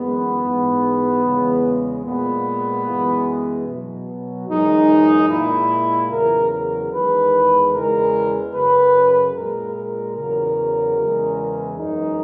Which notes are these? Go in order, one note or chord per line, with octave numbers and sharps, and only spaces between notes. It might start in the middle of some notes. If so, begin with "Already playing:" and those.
Already playing: F#2 E3 G#3 B3
G#2 E3 G#3
E2 C#3 G#3
A#2 G#3 B3
F#2 E3 G#3
B2 F#3
F#2 E3 G#3 D#4
A#2 G#3 E4
E2 C#3 F#3 A#4
A#4
E2 D#3 G#3 B4
E2 C#3 E3 G#3 A#4
F#2 C#3 F#3 B4
A#2 G#3 A#4
A#4
E2 C#3 F#3 A#4
E2 C#3 G#3
F#2 E3 G#3 D#4